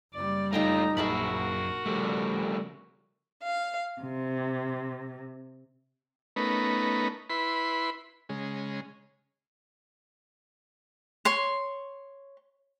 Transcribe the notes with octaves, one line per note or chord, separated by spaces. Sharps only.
F#1 G3 D5
A3 D#4 F4 G5 G#5 A#5
A#1 F#2 F#4 G#4 A#4 E5 A5 B5
C#3 F3 G3 A3
F5
C3
A3 B3 C#4 D#4 A#4 B4
E4 B4 B5 C6
C#3 G#3
C#5 C6